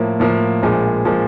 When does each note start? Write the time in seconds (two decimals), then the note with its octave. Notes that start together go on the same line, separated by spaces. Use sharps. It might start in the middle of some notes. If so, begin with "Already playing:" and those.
Already playing: A2 F3 A#3
0.20 A2 F3 A#3
0.62 A#1 A#2 F3 G#3
1.05 A#2 F3 G#3